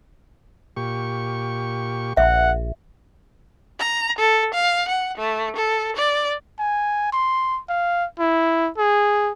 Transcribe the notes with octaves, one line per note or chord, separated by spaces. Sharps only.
A#2 G4 C#6
A#1 E5 F#5
A#5
A4
F5
F#5
A3
A4
D5
G#5
C6
F5
E4
G#4